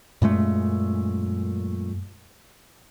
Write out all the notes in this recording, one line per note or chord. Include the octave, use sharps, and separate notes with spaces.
F#2 A#2 G#3 A3